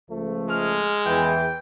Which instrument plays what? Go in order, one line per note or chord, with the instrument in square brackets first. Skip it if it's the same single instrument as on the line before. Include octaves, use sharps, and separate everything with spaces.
[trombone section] C#2 F3 A3
[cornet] G#3 [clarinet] F6
[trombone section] E2 E3 [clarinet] G5